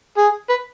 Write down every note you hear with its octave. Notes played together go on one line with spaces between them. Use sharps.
G#4
B4